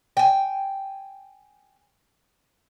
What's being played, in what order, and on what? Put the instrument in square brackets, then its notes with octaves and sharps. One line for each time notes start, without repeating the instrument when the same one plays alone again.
[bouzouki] G5 G#5